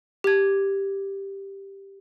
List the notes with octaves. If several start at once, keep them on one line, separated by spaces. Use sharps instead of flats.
G4 G#6